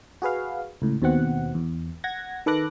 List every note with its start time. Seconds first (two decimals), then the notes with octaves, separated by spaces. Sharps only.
0.22 F#4 G#4 B4 F5
0.82 C#2 A2
1.02 D#2 B2 C4 F#5
1.55 E2
2.04 F#5 G#6 A#6
2.46 D#3 A4 B4 D6 F#6 A#6